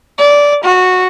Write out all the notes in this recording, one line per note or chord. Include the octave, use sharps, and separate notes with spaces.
D5
F#4